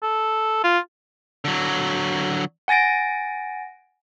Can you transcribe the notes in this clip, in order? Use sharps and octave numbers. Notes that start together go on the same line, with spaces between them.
A4
F4
D3 F#3
F#5 G#5 A6 A#6 D7